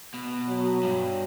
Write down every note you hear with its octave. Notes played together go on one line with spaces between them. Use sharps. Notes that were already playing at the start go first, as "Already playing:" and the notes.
B2
F#3
G2